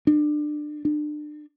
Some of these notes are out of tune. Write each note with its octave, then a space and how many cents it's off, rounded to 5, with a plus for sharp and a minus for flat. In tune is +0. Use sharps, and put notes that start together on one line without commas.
D4 +25
D4 +35